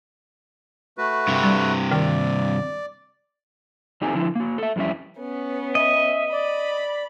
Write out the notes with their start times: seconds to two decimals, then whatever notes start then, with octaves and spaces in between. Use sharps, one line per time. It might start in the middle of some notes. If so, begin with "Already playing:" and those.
0.98 A3 F#4 B4
1.28 G2 C3
1.43 G3
1.91 D#3 D5
4.01 E2 C4 D#4 G4 A4 G#5
4.13 D3 F3 E4
4.35 A#3 F#4
4.58 A4 E5
4.76 F2 E3 G3 C#4 E5
5.19 B3 C#4
5.75 D#5 E5
6.32 D5 B5